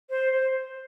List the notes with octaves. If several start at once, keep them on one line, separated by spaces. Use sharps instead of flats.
C5
C5